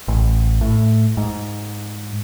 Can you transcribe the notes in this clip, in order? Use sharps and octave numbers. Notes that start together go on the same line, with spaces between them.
A1
A2
G#2